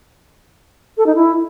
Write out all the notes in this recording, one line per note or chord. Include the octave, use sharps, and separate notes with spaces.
A4
D#4
E4